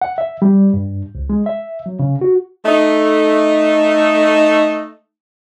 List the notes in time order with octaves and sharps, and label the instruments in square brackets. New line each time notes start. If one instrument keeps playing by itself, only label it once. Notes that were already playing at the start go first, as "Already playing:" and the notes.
[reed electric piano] F#5
E5
G3
G2
C#2
G#3
E5
F#3
C#3
F#4
[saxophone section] A3 D#4